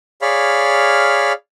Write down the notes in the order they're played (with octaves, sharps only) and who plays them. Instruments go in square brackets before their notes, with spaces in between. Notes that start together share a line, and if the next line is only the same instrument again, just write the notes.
[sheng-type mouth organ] G#4 C#5 D5 F5 B5 F6